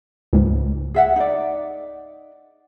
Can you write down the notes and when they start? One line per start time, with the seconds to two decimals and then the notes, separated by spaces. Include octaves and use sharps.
0.33 C#2 G#2
0.94 G#4 E5 F#5
1.16 D#4 D5